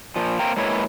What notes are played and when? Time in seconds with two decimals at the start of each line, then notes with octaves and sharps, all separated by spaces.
0.16 A#2 F3
0.39 A#3 C4 G5 A#5
0.57 G#3 A#3 E4 G#4 B4 C#5